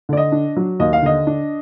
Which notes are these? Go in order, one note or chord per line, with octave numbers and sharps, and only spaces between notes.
D3 D5
D#5
D4
F#3
D#2 D#5
F5
D3 D#5
D4